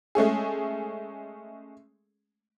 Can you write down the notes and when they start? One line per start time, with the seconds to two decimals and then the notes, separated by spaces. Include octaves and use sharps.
0.15 G#3 A3 C#4 G#4